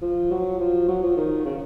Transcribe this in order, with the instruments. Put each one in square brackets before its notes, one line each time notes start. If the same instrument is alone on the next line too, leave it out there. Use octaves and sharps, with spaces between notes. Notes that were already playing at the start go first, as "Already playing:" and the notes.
[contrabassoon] F3
F#3
F3
F#3
F3
D#3
C#3